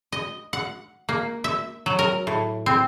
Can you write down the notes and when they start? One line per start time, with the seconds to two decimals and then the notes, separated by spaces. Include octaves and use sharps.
0.12 D#5
0.53 F#5
1.09 A#3
1.44 E5
1.86 F#3
1.99 A#4
2.27 A2
2.66 C4